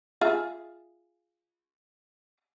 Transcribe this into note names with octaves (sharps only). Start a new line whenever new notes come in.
F4 G#4 E5